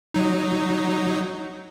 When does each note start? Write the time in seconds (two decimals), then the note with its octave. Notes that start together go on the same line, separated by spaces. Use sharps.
0.14 F#3 D#4